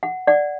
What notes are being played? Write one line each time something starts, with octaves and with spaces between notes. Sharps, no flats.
F#5
D5 F#5